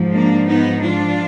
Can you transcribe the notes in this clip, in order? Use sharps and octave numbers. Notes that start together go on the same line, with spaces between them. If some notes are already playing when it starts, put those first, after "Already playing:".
Already playing: G#2 F3
A#3 D4
B3 D#4
D4 F4